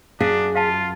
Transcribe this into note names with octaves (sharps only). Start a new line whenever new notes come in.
F#2 D4 G#4 F5
F4 F5 A5